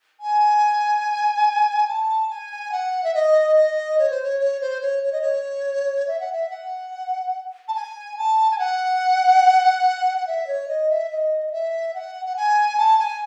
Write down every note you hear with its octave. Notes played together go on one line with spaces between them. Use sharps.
G#5
A5
G#5
F#5
E5
D#5
D#5
C#5
C5
C#5
C#5
C5
C#5
C#5
D#5
C#5
E5
F#5
E5
F#5
A5
G#5
A5
G#5
F#5
F#5
E5
C#5
D#5
E5
D#5
D#5
E5
F#5
F#5
G#5
A5
G#5